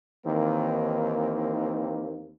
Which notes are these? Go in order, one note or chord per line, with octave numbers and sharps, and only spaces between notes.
D#2 D#3 E3 A#3 C4